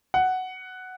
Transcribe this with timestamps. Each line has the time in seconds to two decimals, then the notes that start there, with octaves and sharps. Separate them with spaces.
0.14 F#5